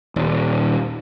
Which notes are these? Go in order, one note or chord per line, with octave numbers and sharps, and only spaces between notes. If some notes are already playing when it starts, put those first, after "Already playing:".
D#1